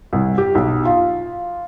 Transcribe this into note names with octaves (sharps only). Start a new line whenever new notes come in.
C2
G4
B1
F4